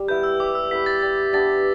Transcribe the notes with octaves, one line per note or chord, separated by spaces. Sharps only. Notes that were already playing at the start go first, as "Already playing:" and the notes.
Already playing: G3
B3 E4 B4 G6
E6
G3 D6
E6
B3 E4 B4 B6
A6
G3 A6
B3 D4 G4 A6